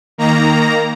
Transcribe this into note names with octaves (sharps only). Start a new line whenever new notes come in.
D#3 A#3 A#5